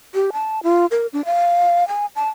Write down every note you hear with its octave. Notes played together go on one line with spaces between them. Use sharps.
G4
A5
F4
A#4
D4
F5
G#5
A5